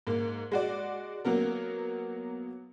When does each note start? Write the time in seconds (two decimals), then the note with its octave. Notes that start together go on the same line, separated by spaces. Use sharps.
0.07 G#2 A#3
0.52 G#3 F#4 D5
1.25 F#3 A#3 B3 A#4